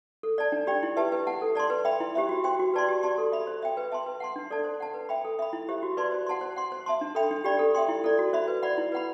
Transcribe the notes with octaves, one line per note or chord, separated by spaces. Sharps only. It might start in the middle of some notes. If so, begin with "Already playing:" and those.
A4
D5 A5
D4
G4 D5 G5 B5
E4
G4 B4 E5 A5
B4
F#5 A5
A4
D5 A5 C6
B4
E5 G5 B5
E4
G4 C5 E5
F#4
C5 G5 C6
F#4
B4 D5 A5 C6
G4
D5 A5 C6
A4
E5 B5
C5
E5 G5
B4
E5 A5 C6
B4
F#5 A5 C6
D4
A4 D5 A5
C5
F#5 A5
B4
E5 G5 B5
A4
E5 B5
E4
G4 C5 E5
F#4
B4 D5 A5 C6
C5
F#5 A5 C6
C5
F#5 C6
C5
E5 A5 C6
D4
A4 E5 G5 B5
D4
G4 D5 G5 B5
A4
E5 G5 C6
E4
A4 D5
F#4
C5 E5 B5
B4
D5 F#5 B5
E4
B4 F#5 B5